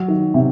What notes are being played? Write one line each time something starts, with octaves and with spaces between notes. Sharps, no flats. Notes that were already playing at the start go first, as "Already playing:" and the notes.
Already playing: F#3
D#3
C3